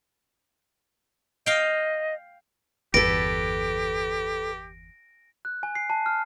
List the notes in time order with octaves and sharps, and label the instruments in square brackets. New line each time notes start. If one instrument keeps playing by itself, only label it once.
[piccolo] D#5 [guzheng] F5 G5
[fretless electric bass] G1 E2 [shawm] G4 [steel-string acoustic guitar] A4 B4 [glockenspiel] A#6 D7
[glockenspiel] F#6
G#5
C7
A5
F6